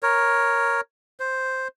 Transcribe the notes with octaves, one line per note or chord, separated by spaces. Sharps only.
A#4 C#5
C5